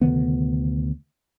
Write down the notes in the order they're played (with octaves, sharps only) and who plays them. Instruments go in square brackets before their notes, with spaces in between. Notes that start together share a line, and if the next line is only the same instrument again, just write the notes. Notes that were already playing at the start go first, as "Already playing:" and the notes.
[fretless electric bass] D2 C3 D#3 B3